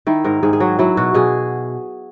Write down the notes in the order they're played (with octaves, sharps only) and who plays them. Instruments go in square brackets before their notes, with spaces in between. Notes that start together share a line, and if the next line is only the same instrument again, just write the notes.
[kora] D#3 E4
G#2 A#4
G#2 G#4
G#4
F#3 F#4
F#3 E4
B2 F#4
B2 G#4